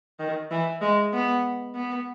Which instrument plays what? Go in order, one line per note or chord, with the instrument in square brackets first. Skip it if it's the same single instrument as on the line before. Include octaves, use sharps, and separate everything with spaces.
[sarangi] D#3
E3
G#3
B3
B3